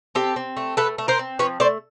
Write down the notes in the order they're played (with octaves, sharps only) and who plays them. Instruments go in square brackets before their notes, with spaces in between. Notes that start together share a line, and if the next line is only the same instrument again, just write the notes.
[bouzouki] C4 G4 A4
C4
A3
A3 A4 B4
A3
A#4 C5
C4
F3 B4 C#5
A3 C5 D5